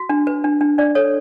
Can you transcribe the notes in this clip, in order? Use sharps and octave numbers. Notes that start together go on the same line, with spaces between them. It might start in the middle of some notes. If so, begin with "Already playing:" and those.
Already playing: F#4
D4
B4
D4
D4
D4 D5
A4 C#5